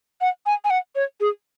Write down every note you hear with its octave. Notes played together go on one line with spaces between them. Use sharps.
F#5
G#5
G#5
F#5
C#5
G#4